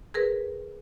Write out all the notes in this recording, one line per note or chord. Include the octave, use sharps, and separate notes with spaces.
G#4 A#4 B4